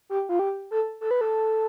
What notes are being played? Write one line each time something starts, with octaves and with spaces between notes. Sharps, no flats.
G4
F4
G4
A4
A4
B4
A4